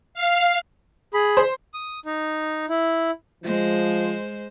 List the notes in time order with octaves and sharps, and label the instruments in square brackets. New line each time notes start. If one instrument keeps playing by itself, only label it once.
[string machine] F5
[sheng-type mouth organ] G#4 B5
[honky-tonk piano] C5
[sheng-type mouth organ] D#6
D#4
E4
[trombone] F3 [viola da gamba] G#3 C5